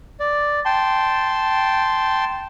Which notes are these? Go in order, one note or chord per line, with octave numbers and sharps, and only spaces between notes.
D5
G5 A5 C6